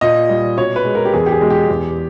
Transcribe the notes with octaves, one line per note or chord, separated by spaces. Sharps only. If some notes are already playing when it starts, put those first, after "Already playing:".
A#2 D#5
G3
B2 C#5
B4
G#3
A#4
G4
E2 G#4
G4
G#4
B2 G#3
G4
E2